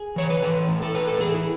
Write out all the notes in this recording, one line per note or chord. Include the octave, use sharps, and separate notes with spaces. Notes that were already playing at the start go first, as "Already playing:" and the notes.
Already playing: G#4
E3 C#5
B4
E3 A4
A2
A4
A2 B4
A4
E3 G#4
E4